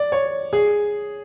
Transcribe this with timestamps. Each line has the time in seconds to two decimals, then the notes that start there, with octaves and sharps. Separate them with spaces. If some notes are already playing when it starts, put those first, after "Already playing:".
Already playing: D5
0.12 C#5
0.53 G#4